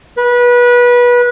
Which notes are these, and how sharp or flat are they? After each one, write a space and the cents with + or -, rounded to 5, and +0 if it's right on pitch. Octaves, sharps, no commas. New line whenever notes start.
B4 -25